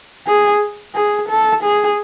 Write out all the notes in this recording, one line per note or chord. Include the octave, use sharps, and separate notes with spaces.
G#4
G#4
A4
G#4